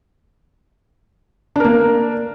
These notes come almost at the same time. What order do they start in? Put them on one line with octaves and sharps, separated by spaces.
D4 A#4 A#3